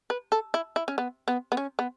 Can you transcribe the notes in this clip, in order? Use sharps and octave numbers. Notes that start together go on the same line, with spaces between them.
B4
A4
E4
E4
C#4
B3
B3
B3
C#4
B3